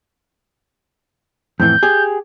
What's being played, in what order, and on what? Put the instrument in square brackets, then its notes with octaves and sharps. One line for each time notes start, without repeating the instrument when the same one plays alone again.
[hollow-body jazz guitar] F2 A2 E3 [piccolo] G6
[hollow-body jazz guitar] G4 G#4